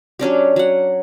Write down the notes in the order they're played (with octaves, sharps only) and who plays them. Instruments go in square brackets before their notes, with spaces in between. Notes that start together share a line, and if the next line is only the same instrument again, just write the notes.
[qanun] F#3 C#4 D4 G4
F#3 F#5